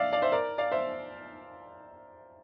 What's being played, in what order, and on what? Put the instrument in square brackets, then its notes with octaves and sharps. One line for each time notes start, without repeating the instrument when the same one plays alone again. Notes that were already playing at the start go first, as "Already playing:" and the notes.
Already playing: [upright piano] D5 E5 F5
D5 F5
C5 E5
A#4 D5
D5 F5
C5 E5